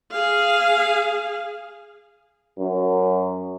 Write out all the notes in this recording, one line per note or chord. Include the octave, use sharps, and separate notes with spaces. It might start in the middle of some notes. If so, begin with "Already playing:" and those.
G#4 F5
F#2